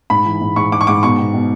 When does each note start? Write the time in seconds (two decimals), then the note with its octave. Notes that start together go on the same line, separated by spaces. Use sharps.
0.10 G#2 B5
0.25 E3
0.41 G#2
0.56 G#2 C#6
0.72 G#2 D6
0.81 C#6
0.87 G#2 D6
1.03 B2 C#6
1.18 B2
1.34 B2